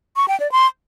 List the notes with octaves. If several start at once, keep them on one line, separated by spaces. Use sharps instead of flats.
C#6
G5
D5
C6